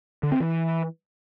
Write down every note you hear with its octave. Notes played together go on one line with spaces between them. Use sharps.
D3
C4
E3